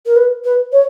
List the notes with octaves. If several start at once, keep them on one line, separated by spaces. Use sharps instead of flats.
A#4
B4
B4
C#5